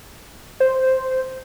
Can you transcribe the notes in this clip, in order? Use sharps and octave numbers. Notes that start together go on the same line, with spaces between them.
C5